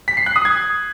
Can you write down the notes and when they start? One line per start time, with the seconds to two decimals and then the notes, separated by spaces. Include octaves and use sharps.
0.08 B6
0.17 C7
0.26 F#6
0.36 D#6
0.45 G#6